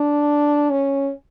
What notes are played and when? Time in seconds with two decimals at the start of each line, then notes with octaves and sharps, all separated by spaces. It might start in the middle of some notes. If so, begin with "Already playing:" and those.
Already playing: D4
0.70 C#4